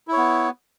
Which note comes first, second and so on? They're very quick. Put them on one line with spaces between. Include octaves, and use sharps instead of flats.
E4 C#5 B3